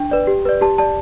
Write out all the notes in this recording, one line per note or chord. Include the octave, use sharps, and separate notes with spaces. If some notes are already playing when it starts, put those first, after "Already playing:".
Already playing: D4 G5
B4 D5
G4
B4 D5
G4 A5
D5 A5